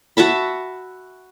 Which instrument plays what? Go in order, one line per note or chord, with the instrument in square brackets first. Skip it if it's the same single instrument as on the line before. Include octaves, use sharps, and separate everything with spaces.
[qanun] F#4 E5 A5 B5